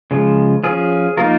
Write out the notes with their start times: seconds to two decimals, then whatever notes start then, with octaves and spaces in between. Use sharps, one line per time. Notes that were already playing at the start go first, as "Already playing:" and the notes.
0.11 C#3 F3 G#3
0.64 F3 C#4 G#4
1.17 F3 A#3 D#4 F4 A#4